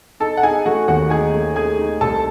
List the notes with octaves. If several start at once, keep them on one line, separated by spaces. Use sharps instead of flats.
D#4 A4 A5
F#5
D#4 G#4 G#5
A3 F#4 F#5
D#2 F#4 F#5
D#4 G#4 G#5
A3
A3 G#4 G#5
D#4
C2 A4 A5